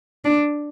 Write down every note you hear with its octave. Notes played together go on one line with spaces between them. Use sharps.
D4